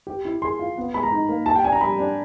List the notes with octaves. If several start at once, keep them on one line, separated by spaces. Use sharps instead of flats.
G4
E4
G#4 C6
F4
B3
G#3 B5
A#5
D#4
A#3
G4 A5
G5
D4 G#5
A#5
G3 B5
D4